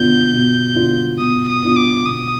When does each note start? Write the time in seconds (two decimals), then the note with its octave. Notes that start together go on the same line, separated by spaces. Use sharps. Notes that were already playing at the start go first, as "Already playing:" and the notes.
Already playing: B2 B3 D4 F4 G6
0.33 B2
0.75 B3 D4 F4
1.19 B2 D#6
1.48 D#6
1.62 B3 D4 F4
1.76 D6
2.05 B2 D#6